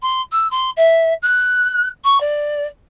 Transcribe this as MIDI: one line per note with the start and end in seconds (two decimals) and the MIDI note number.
0.02 0.22 84
0.32 0.48 88
0.51 0.70 84
0.77 1.14 76
1.22 1.87 90
2.04 2.20 85
2.20 2.67 74